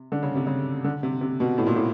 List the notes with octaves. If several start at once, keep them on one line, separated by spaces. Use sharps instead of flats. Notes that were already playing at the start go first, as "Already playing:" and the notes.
Already playing: C3
D3
C#3
C3
C#3
D3
C3
C3
B2
A2
A#2
A2